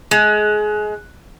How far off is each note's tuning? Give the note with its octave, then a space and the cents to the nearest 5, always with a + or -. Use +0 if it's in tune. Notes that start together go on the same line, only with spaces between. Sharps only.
G#3 +25